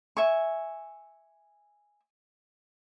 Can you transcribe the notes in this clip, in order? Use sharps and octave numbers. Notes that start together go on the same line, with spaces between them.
E5 G#5 C#6